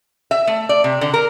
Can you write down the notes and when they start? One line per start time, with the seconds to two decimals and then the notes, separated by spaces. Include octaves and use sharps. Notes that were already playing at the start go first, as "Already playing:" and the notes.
0.31 E5
0.47 A3
0.69 D5
0.84 C3
1.01 D3
1.14 A#4